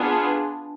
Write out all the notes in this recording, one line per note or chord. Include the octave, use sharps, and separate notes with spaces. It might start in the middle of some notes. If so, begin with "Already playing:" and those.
Already playing: B3 D4 F4 G#4